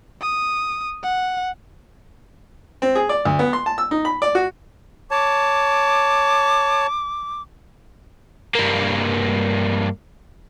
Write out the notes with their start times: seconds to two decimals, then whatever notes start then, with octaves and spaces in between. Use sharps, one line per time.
0.21 D#6
1.03 F#5
2.82 C4
2.95 G#4
3.09 D5
3.25 D2
3.39 B3
3.53 C6
3.66 A5
3.78 E6
3.91 D#4
4.05 B5
4.22 D5
4.35 F#4
5.11 C#5 A5 D6
8.55 G2 A#3